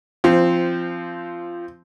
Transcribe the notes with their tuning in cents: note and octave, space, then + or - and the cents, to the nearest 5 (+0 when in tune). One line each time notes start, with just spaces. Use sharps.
F3 -15 C4 +0